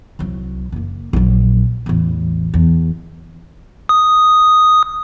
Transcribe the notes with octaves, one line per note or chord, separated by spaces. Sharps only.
C2 F#3
F#1 A#3
A#1 F#3
A1 E2
E2
D#6